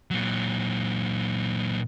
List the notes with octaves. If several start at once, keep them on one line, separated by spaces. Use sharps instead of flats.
A#2 F#3